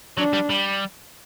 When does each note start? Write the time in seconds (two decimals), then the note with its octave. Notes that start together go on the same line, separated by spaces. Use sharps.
0.18 F#3 D4
0.33 G3
0.50 G3